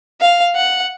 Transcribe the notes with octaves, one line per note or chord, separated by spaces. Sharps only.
F5
F#5